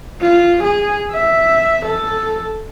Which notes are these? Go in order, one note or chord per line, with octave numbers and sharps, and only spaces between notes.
F4
G#4
E5
A4